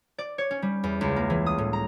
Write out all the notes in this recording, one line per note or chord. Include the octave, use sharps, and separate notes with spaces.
D5
C#5
C#4
G3
E2
C#2
A#3
E3
D#6
A2
A#5